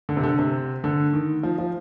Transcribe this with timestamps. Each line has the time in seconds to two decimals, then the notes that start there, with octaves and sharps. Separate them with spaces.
0.09 D3
0.17 C3
0.23 D3
0.39 C3
0.84 D3
1.13 D#3
1.43 F3
1.58 F3